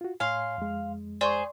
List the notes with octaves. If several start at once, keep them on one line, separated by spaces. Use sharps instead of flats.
F4 F#4
A2 C#5 F5 G#5 C6
F2 G#3
G#4 C5 D5 C6 C#6